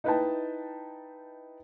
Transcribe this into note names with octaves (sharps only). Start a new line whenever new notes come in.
D#4 E4 B4 D#5 G5 A5